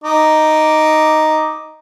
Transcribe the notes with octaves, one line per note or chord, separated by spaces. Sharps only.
D#4 D6